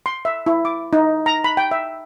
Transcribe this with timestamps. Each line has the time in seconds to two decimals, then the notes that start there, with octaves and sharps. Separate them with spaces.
0.06 C6
0.25 E5
0.46 E4
0.65 D6
0.93 D#4
1.26 A#5
1.44 B5
1.57 G5
1.71 E5